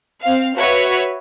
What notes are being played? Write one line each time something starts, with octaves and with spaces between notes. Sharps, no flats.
C4 F5
F#4 B4 C#5 E5